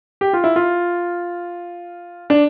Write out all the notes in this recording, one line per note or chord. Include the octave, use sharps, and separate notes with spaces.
G4
F4
E4
F4
D4